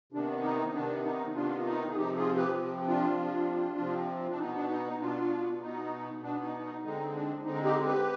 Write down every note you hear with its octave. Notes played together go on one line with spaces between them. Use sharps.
C3 D#3 B3 D4
D#4
C3 D#3 B3 D4
D#4
C3 D#3 B3 D4 F4
D#4
G#4
C3 F3 C4 D#4 G4
F4 G#4
G4 B4
C3 F3 C4
D4 F4
C3 F3 C4
C3 F3 C4
D4
B2 B3 D#4
D4
D#4
D#4
B2 B3 D4 F4
B2 B3 D#4
B2 B3 D4
D#4
D#4
D3 G#3 C4 D#4
D4
D3 G#3 C4 D#4
D#4 G4
G4 B4